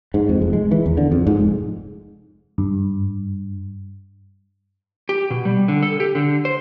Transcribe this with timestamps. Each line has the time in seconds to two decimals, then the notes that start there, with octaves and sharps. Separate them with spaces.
0.14 G#2
0.29 F2
0.42 F1
0.53 G#3
0.71 E3
0.86 E2
0.97 D3
1.12 F2
1.27 G#2
1.40 F1
2.58 G2
5.09 G4
5.30 B2
5.45 G3
5.68 D3
5.83 A4
6.00 G4
6.15 D3
6.45 C5